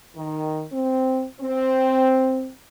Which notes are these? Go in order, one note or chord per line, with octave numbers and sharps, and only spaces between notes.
D#3
C4
C4